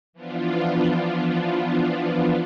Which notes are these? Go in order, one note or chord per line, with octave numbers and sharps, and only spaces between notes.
E3 F3 B3 D4 F4